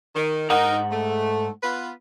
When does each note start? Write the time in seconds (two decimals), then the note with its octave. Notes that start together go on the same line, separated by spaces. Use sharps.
0.15 D#3
0.50 G#2 D#4 A#4 F#5 A#5
0.92 A3
1.63 B3 F4 B4